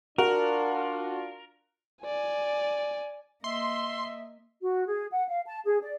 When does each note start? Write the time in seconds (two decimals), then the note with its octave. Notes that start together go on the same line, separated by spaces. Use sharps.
0.18 D4 F4 F#4 A#4
2.03 D5 G#5
3.44 A#3 D#5 E5 C6
4.61 F#4
4.87 G#4
5.12 F#5
5.28 F5
5.45 A5
5.65 G#4
5.82 D5